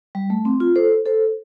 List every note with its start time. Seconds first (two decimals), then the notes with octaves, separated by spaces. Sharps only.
0.15 G3
0.30 A3
0.45 C4
0.60 F4
0.76 A4 C5
1.06 A4 C5